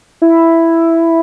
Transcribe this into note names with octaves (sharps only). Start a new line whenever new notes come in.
E4